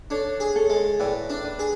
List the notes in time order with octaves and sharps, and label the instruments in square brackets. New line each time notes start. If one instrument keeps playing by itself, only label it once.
[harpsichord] D4 [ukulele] A4 C#5
[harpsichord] G#4
[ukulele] A4 C#5
[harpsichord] G#3
[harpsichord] A2 [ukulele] B4 D5
[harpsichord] D4
[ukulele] B4 D5
[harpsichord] G#4